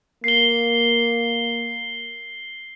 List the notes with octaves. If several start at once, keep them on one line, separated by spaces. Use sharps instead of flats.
A#3 C7 G7